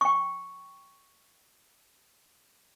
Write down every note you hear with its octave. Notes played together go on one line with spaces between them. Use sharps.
G5 C#6